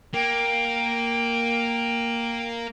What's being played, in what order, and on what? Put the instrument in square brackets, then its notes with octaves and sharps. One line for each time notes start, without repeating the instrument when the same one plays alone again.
[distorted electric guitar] A#3 [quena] G5